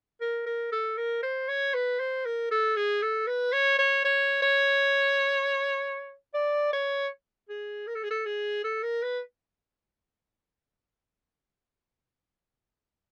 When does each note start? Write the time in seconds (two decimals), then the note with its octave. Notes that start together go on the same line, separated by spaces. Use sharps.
0.21 A#4
0.46 A#4
0.72 A4
0.97 A#4
1.23 C5
1.48 C#5
1.74 B4
2.00 C5
2.25 A#4
2.51 A4
2.76 G#4
3.02 A4
3.27 B4
3.53 C#5
3.79 C#5
4.05 C#5
4.42 C#5
6.34 D5
6.73 C#5
7.49 G#4
7.87 A#4
7.95 A4
8.03 G#4
8.11 A4
8.26 G#4
8.64 A4
8.83 A#4
9.03 B4